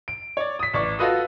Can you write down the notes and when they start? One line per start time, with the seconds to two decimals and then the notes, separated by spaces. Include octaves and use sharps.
0.08 D7
0.37 C#5 D5
0.59 D#6 B6
0.73 A1 D5 C#6
0.99 F4 F#4 A4 B4 D#5 D#6